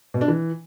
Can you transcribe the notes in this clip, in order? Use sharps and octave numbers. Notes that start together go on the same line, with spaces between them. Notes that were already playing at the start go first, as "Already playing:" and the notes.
B2
D4
E3